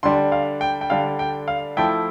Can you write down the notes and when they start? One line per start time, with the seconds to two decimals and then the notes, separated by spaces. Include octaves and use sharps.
0.03 D3 G3 D4 C6
0.32 F5
0.61 G5
0.81 G5
0.90 D3 G3 D4 F5
1.19 G5
1.48 F5
1.77 F3 A3 E4 G5